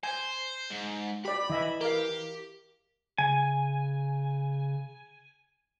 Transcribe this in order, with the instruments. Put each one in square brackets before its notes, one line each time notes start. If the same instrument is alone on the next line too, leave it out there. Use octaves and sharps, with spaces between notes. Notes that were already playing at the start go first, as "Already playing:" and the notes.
[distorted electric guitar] C5 [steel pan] G#5
[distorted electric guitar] G#2
[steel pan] G4 D5 [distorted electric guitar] B5
[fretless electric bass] E3 [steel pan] D#5 E5
[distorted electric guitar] G4 [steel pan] A#4 F5
[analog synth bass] C#3 [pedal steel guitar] G#5